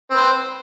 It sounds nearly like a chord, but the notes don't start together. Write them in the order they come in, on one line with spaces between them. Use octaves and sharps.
C4 B4 C5